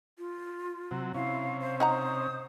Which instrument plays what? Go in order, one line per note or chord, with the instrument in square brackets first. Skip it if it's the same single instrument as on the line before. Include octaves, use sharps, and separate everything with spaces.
[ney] F4
[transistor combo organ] C3 F#3
[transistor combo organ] C3 C#4 [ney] E4 [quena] F5
[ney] C5 [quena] F5
[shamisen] D#4 F#5 A#5 [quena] D#6